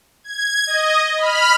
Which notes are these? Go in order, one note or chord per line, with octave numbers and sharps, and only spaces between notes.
G#6
D#5
B5 F6